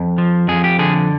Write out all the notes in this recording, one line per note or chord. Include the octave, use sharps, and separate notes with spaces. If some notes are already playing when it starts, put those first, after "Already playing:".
Already playing: F2
F3
F2 G#4
G4
D3 G#4